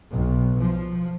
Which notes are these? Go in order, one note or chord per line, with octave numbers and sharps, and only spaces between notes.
B1
F3